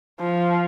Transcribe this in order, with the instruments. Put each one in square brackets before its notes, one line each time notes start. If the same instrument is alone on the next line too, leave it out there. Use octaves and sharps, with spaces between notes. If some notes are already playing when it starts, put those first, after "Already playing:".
[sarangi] F3